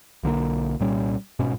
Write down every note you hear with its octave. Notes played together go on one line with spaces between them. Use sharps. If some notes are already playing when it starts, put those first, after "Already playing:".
B1 D3 D#3 A#3
C2 A#2 G3 C#4
G1 G#2 B2 C#4